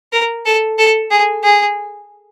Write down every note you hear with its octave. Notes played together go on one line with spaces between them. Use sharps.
A#4
A4
A4
G#4
G#4